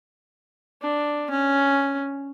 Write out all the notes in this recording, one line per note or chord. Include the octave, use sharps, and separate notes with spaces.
D4
C#4